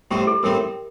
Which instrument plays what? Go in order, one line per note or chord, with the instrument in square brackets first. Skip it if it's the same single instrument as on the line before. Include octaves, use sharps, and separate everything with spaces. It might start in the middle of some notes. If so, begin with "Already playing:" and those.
[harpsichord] A2 G3 C4 D#4 [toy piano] G4
[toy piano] A4
[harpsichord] A2 G3 C4 D#4 [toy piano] A#4